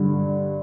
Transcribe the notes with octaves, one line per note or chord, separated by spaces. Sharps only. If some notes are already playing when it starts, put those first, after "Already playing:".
Already playing: G2 D3